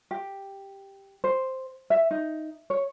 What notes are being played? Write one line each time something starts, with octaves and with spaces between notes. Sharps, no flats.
G4
C5
E5
D#4
C#5